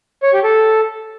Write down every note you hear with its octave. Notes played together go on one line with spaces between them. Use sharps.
C#5
G4
A4